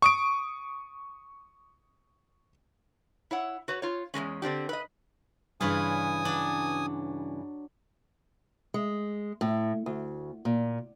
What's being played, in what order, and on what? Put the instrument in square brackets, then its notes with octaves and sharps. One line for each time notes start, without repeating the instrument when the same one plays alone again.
[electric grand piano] C#6 D#6 D7
[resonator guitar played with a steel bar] E4 C#5 F#5
F#4 B4 C#5
F4 C#5
E2 C#3 G#3 C#4
D3 C4 D4 G4
B4 D#5
[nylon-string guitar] G2 C#3 E3 [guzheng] F4 B4 C#5 [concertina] G#5 D#6
[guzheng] F#3 D4
[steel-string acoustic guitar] G#3
A2
D2
A#2